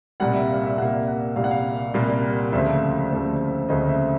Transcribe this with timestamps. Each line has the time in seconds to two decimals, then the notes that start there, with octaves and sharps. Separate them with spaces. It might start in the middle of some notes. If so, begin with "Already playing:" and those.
0.20 C2 A#2 G3 A#3 F#5
0.34 E5
0.49 F5
0.64 E5
0.77 C2 A#2 G3 A#3 F#5
1.07 F#5
1.36 C2 A#2 G3 A#3 F5
1.44 F#5
1.51 F5
1.94 C2 A#2 G3 A#3
2.52 D2 C#3 F3 A3 C4 E5
3.10 D2 C#3 F3 A3 C4
3.69 D2 C#3 F3 A3 C4 D#5
3.88 E5